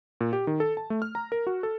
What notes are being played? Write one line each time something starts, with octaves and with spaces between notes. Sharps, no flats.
A#2
G4
D#3
A4
A5
A3
F6
A#5
A#4
F#4
A4